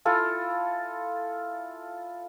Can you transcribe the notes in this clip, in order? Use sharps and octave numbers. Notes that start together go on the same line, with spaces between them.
E4 F4 A4 G#5